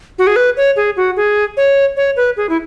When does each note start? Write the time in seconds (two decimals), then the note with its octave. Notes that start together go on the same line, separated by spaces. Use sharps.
0.19 F#4
0.27 G#4
0.36 B4
0.57 C#5
0.76 G#4
0.97 F#4
1.16 G#4
1.57 C#5
1.97 C#5
2.16 B4
2.37 G#4
2.49 E4